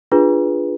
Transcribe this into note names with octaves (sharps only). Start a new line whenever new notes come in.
D4 F4 G#4 B4